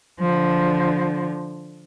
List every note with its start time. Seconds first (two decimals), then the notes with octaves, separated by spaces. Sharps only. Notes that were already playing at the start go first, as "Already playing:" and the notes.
0.20 D3 F3